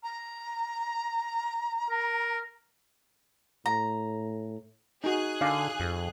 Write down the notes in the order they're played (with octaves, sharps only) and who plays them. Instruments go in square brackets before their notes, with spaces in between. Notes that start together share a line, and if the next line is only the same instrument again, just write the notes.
[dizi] A#5
[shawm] A#4
[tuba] A2 [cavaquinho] A#5
[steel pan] D#4 F#4 [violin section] G#4 F#6
[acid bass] D3 [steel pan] D5 F5 D6
[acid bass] F2